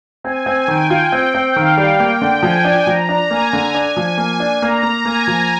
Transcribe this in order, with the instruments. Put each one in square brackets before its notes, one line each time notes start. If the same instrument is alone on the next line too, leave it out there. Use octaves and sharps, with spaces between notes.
[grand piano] C4 [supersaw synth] G#5
[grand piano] C4
[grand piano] D#3 [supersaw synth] G5
[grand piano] F4
C4
C4
[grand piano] D#3 [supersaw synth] F5
[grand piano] G3
[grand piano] A#3 [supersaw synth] G5
[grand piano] D3
[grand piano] F3 [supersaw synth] G#5
[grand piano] D4
[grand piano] F3 [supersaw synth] A#5
[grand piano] D4
[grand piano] A#3 [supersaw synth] G#5
[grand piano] D3
[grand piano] D4 [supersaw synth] G#5
[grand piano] F3
[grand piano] A#3 [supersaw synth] G#5
[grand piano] D4
[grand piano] A#3 [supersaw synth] A#5
[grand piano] A#3
[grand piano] A#3 [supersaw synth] G#5
[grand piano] F3